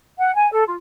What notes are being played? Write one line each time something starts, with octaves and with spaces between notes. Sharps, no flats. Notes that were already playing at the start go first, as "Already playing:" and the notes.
F#5
G#5
A4
F4